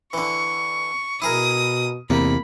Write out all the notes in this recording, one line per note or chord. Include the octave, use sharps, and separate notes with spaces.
D3 E3 C#6
B2 E4 G#4 A#4 D#6
E2 C3 A#3 B5